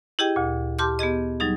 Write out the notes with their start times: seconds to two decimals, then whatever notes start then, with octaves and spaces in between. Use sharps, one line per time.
0.19 E4 G4 G#4 D#5 G5
0.36 D2 A#2
0.78 G4 A5 C6 D6 F6 G6
0.99 B3 G4 G#4 D#5
1.40 F#3 G3 D#4 G#4